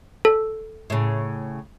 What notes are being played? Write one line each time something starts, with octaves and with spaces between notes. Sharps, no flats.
A4
A2 C#3